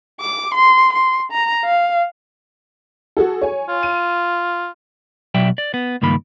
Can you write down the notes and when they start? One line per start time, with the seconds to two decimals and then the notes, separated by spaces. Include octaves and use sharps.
0.21 D6
0.54 C6
0.92 C6
1.32 A#5
1.64 F5
3.17 F#4 G#4 A4
3.42 C#5 G#5
3.69 F4
3.83 D#7
5.34 B2 F#3 D5 E5 G5
5.58 D5
5.74 B3
6.02 C#2 G2 D#3 A#3 B5